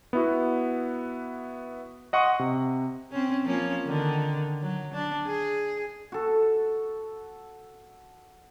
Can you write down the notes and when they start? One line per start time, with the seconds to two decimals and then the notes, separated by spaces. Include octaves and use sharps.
0.13 B3 E4 F#4
2.13 D#5 F#5 C6 C#6 D#6
2.39 C3
3.12 C4 C#4
3.44 F3 A#3 C#4
3.87 D3 D#3
4.61 F#3
4.93 D4
5.26 G#4
6.12 F#4 A4